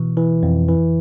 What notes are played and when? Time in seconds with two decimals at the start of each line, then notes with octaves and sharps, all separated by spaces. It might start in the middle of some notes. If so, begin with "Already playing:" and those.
Already playing: B2 E3
0.17 E3
0.43 F2
0.69 E3